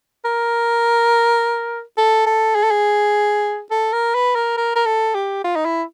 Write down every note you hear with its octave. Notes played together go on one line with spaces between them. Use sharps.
A#4
A4
A4
G#4
A4
G#4
A4
A#4
B4
A#4
A#4
A#4
A4
G4
F4
D#4
E4